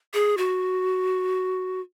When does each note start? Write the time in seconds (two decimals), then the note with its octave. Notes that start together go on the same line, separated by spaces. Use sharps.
0.14 G#4
0.37 F#4